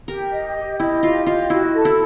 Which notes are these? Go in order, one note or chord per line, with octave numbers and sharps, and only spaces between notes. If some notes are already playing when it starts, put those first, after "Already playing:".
G4 A#4
D#5
G4
E4 D#5
F4 G4
F4 D#5
E4 F#4
A4
E4